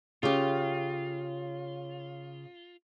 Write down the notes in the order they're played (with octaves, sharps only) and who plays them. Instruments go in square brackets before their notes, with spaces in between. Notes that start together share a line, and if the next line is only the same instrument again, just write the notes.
[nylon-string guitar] C#3 G4 [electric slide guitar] F4